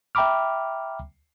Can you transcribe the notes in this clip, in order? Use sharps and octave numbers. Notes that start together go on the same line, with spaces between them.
E5 G5 A#5 B5 D6 F6